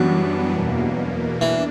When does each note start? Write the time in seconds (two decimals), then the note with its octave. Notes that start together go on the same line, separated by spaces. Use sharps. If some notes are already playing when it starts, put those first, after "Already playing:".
Already playing: F#2 E3 F#3 G3 B3 D4
0.51 E2 B2 A#3
1.41 E3 D4